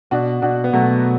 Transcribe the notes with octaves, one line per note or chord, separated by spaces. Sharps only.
B2 D4 F#4
B2 D4 F#4
B3
B2 F#3 A3